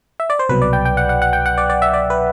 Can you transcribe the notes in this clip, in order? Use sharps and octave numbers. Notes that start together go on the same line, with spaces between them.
E5
D5
C5
C2 B2 F#3 B4
D5
G5
G5
F#5
F#5
F#5
G5
F#5
D5
D5
E5
D5
B4